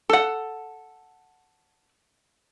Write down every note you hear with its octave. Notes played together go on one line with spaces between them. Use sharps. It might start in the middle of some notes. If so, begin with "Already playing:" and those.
A4 F#5